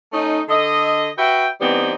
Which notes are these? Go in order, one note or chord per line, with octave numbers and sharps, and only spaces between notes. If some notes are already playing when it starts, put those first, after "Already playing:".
A3 C#4 D#4
D3 A4 D#5
F#4 B4 E5 G5
E3 G3 B3 C4 D#4